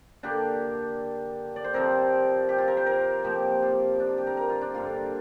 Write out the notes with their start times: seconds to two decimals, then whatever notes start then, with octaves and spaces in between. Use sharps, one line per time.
0.23 D3 A#3 D4 G4
1.56 D5
1.64 C5
1.73 C3 F3 C4 A#4
2.49 G4
2.58 F4
2.68 A#4
2.77 C5
2.86 A#4
3.24 C3 F3 A#3 G4
3.62 F4
4.00 D4
4.18 G4
4.27 A#4
4.37 A#4
4.49 F4
4.61 D4
4.74 G2 D3 A#3 D4 F4